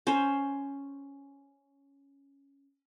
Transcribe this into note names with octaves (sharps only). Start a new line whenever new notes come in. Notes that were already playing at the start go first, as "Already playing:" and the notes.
C#4 C5